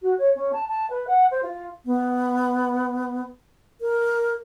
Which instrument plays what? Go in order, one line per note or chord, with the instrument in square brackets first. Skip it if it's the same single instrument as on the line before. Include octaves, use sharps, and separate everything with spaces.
[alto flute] F#4
C#5
C#4
A5
A5
B4
F#5
C5
F4
B3
A#4